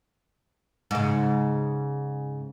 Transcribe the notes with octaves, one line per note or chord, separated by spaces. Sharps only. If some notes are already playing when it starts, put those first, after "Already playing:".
G#2 C#3